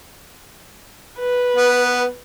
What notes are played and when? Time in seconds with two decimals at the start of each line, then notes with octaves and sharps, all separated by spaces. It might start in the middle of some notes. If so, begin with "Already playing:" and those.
1.19 B4
1.56 B3